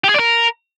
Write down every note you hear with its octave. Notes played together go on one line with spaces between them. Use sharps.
G4
G#4
D5
A#4